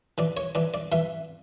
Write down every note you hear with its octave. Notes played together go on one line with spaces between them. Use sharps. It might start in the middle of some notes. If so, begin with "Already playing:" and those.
E3 D5
C#5
E3 D5
D5
E3 E5